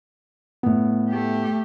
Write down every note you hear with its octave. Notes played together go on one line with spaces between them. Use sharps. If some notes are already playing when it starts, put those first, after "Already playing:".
A2 B3
A3 G4